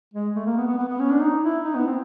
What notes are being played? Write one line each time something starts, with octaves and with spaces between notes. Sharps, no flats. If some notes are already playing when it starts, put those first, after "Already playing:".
G#3
A3
A#3
B3
B3
B3
B3
C#4
D4
D#4
E4
D#4
B3
C4